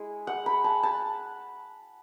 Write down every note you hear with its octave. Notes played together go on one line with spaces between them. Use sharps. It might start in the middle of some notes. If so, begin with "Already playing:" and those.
Already playing: G#3 E4
F#5
B5
A5
A5